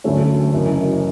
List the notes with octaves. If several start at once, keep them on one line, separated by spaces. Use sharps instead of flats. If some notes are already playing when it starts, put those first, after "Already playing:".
D2 D3 F#3 A3 C#4
F#1 F#2 E3